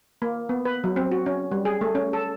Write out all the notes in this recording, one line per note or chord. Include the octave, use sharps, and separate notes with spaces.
A#3
B3
B4
F#3
C4
F#4
C#4
G3
G#4
A3
C#4
A4